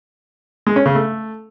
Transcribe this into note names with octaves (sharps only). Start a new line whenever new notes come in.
G#3
C#4
C#3
A3